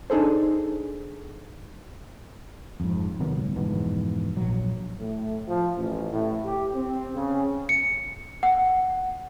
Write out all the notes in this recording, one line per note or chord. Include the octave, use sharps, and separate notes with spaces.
D4 D#4 G#4 A4 C5
F2 G#2
C3 D#3 F#3 B3
D1 G1
F2 G#2 B2 E3
A#1 F#3
A2
F3
A1
A2
G4
C4
C#3
C#7
F#5